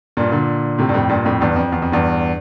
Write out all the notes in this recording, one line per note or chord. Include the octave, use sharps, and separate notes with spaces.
G2 A#2
A#2 D3
A2 C3
G2
F2 A2
G2 A#2
F2 A2
E2 G2
F2
E2
F2
E2 G2